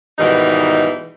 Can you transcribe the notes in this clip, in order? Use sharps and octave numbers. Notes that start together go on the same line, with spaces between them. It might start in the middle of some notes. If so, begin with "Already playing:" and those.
G#2 B2 D#3 E3 G3 D#4